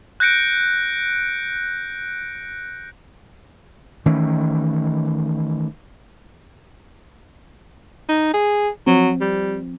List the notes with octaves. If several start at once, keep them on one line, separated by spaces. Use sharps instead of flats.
F#6 G6 A#6 C#7 D7
D#3 E3 A3 C#4
D#4
G#4
F3 F#3 C4
G3